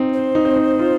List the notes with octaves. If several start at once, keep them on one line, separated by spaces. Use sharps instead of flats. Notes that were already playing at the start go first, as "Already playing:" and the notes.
Already playing: C4 D#4
C5
D#4
C4
D#4
F4